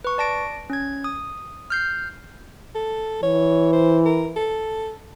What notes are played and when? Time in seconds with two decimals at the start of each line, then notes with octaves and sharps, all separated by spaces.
0.05 B4 C#6
0.18 D5 A5 A#6 D7
0.70 C#4 G#6
1.04 D#6
1.70 F6 G6 C7
2.75 A4
3.23 E3 C#5
3.73 C5
4.05 A#4
4.36 A4